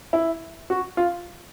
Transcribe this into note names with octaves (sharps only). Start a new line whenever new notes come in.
E4
F#4
F4